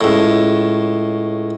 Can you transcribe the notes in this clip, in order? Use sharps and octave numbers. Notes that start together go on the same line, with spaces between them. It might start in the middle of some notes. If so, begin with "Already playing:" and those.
C#2 A2